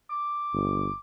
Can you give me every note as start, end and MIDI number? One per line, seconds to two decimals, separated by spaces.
0.10 0.97 86
0.54 0.89 31